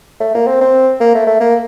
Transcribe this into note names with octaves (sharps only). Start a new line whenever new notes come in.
A3
A#3
C4
C4
A#3
A3
A3
A#3